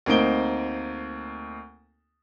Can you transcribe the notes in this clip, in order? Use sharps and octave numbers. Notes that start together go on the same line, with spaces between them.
D2 A#3 C4 D#4 D7 G7